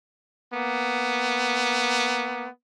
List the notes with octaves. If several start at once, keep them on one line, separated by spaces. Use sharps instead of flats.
A#3 B3